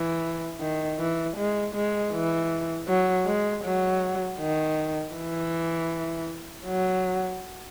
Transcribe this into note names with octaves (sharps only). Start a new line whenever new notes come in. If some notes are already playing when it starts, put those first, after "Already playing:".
Already playing: E3
D#3
E3
G#3
G#3
E3
F#3
G#3
F#3
D#3
E3
F#3